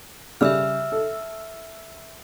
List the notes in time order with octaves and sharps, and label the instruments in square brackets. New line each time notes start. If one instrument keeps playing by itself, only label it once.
[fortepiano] C#3 G3 [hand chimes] E5 E6 F6
[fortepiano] A4